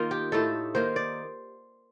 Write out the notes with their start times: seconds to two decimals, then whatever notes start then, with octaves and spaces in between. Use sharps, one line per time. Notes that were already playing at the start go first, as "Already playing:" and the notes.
Already playing: D#3 A#3 D#4 F4
0.11 G4
0.32 A2 A3 D#4 A4
0.75 D#3 A#3 D#4 C5
0.96 D5